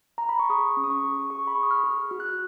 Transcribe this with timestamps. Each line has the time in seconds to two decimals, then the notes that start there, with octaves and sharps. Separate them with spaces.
0.18 A#5
0.29 B5
0.39 C#6
0.50 G#4 D#6
0.77 C#4
0.84 D#6
0.90 C#6
1.04 G#4
1.30 G#4 C#6
1.47 B5
1.55 G#4 C#6
1.63 D#6
1.71 F6
1.84 G#4
2.11 F#4 F6
2.20 F#6
2.29 F6